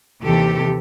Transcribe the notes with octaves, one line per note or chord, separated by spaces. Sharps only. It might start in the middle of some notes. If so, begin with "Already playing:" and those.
D#2 C3 E3 G4 A4